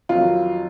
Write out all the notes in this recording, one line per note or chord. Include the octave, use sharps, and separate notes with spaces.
F2 D#3 F#3 F4